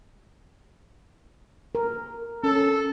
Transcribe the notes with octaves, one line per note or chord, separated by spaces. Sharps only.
A#4
C#4 A4